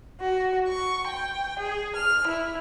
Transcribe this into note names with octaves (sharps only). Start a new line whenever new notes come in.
F#4
C#6
G5
G#4
F6
E4